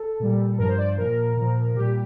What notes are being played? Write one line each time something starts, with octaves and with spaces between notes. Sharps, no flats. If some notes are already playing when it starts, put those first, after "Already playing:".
Already playing: A4
A#2 G3
G2 F3 A#4
C5
D5
C5
A#2 F3 A#4
A#2 F3
A#2 G3 G4